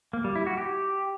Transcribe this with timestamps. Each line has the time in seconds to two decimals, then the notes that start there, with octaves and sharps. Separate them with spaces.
0.13 A#3
0.24 G3
0.36 E4
0.47 F#4
0.58 G4